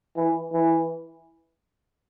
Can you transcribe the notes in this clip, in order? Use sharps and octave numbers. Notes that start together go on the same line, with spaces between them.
E3
E3